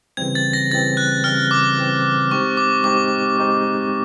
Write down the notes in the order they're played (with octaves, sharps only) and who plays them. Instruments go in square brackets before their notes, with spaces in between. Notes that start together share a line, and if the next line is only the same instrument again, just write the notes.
[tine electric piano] C#3 E3 G3 C4 [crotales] G#6
[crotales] A6
A#6
[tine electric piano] C#3 E3 G3 C4 [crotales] A6
[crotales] F#6
[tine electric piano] C#3 E3 G3 C4 [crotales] F6
[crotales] D6
[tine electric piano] C#3 E3 G3 C4
[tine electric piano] G#3 C4 D#4 G4 C5 [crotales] C#6
[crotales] D6
[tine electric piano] G#3 C4 D#4 G4 C5 [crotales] D6
[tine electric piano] G#3 C4 D#4 G4 C5